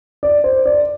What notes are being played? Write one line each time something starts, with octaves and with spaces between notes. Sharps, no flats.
D5
C5
D5